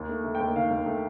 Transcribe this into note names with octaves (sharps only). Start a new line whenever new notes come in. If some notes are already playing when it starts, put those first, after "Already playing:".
Already playing: D#2
A3
A3
G5
D#2
D#3 F5
D#2
A3